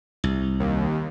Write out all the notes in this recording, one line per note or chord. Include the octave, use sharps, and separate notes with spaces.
C2
D#2